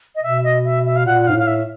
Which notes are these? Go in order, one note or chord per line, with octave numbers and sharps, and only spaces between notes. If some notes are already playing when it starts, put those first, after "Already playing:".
D#5
B2 E5
D#5
E5
E5
F5
A#2 F#5
F#5
G#2 F5
A2
F5
E5